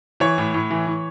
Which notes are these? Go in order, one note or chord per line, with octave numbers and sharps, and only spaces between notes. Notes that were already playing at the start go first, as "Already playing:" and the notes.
E3 C#5
A2
A2
E3
E3